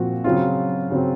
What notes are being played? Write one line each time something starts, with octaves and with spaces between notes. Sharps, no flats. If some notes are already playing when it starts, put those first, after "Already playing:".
Already playing: A#2 F3 C4 F#4
C#3 F#3 C4 F4
C#3 F#3 C4